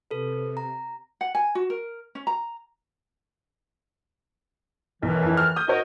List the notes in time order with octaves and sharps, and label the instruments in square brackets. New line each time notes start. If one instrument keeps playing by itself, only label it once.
[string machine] C3 [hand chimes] A4 B4
[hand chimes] A#5
[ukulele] F#5
G#5
F#4
A#4
C#4
A#5
[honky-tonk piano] B1 [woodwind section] F#2 D#3 E3
[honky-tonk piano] F2 E4
F6
D#6 G6
[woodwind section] D#4 A#4 D#5 [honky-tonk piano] F#4 C#5